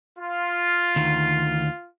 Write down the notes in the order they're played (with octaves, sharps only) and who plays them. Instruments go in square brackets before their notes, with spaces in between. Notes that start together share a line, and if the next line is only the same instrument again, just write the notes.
[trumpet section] F4
[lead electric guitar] D2 D#3